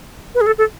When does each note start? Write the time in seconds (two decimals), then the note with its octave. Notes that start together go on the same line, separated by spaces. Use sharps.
0.35 B4
0.41 G#4
0.46 A4
0.58 A4